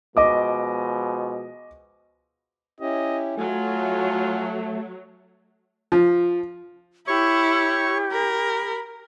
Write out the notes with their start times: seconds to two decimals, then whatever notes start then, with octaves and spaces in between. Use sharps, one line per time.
0.17 B2 F3 G#3 D#5 D6
2.80 C#4 E4 G4 D#5
3.37 F#3 A3 F4 F#4 G#5
5.92 F3
7.07 E4 G4 C#5 C#6
8.12 A#4 B5